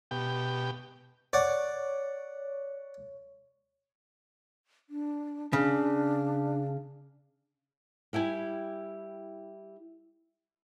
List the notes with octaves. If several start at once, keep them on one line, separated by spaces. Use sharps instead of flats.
B2 G4 G5
C#5 D5 F#5
D4
C#3 D4
G3 E4 G4 G#5